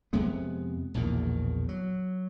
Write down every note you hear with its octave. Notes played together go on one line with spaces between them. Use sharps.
F2 C3 G#3 B3
A#1 E2 B2 D#3
F#3